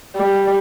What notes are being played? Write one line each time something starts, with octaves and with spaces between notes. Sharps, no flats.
G3